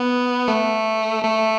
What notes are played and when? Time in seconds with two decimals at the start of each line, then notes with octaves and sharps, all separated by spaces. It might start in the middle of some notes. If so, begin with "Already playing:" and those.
Already playing: B3
0.48 A3
1.24 A3